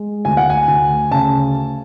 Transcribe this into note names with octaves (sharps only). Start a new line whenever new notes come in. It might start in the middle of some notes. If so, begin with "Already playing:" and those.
Already playing: G#3
D2 G#5
F#5
G#5
D2
C#3 A5